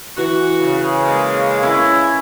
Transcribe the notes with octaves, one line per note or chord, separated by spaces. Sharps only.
E3 F#4
C#3
G#3 A#3 A#4
C#4 E4